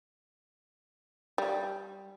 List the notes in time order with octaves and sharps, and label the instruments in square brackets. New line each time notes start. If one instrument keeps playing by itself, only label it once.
[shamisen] G3